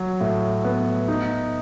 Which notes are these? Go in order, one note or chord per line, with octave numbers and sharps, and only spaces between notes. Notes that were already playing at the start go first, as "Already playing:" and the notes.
Already playing: F#3
A2
B3
D#4